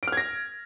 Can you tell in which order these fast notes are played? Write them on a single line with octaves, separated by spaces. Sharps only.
D7 F6 G#6 A#6